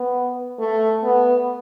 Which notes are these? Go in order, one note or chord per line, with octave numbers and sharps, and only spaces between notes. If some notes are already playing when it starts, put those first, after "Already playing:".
Already playing: B3
A3
B3